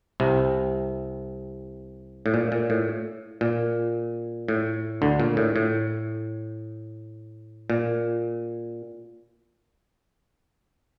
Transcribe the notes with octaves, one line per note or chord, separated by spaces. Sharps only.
C2 C3
A2
A#2
A#2
A2
A#2
A2
D2 D3
A#2
A2
A2
A#2